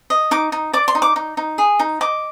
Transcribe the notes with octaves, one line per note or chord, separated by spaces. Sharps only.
D#5
D#4 D6
D#4
D5 D6
C6
D#4
D6
D#4
D#4
G#4
D#4
D#5 D6